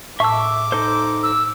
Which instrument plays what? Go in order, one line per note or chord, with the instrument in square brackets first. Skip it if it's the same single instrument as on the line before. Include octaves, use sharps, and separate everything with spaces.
[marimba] A2 A5 [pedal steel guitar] E5 E6 [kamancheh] D6
[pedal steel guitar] D#4 A4 C5
[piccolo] E6